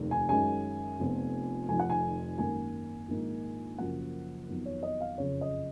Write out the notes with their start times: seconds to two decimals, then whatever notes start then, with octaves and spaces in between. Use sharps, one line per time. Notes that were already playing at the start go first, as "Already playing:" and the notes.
Already playing: F1 D#2 D#3
0.11 G#5
0.29 F#2 D#3 G#3 C#4 G#5
0.99 F1 F2 F3 B3
1.69 F1 F2 D#3 G#5
1.80 F#5
1.90 G#5
2.38 G#1 F#2 D#3 A#3 G#5
3.09 A#1 G#2 D#3 A#3
3.78 F#1 F#2 F3 A#3 F#5
4.48 F2 D#3 F#3 B3
4.66 C#5
4.83 D#5
5.01 F5
5.18 F#1 F2 C#3 C#5
5.41 D#5